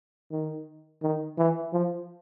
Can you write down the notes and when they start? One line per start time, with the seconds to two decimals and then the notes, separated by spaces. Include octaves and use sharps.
0.31 D#3
1.02 D#3
1.38 E3
1.73 F3